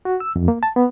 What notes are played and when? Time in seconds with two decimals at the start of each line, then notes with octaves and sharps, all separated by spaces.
0.05 F#4
0.20 E6
0.36 F2
0.48 A#3
0.63 A5
0.76 B3